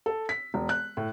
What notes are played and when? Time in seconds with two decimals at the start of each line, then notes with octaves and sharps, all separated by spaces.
0.06 A4
0.29 B6
0.54 E1
0.69 F#6
0.97 A2